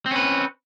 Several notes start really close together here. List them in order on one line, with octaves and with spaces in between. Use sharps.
C4 C#4 B4